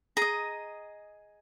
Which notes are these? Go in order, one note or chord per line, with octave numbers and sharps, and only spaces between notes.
G#4 D#5 A#5